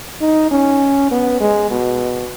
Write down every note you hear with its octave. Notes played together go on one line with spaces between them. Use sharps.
D#4
C#4
B3
G#3
B2